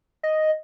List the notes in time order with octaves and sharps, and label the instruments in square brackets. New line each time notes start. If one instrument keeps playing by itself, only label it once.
[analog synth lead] D#5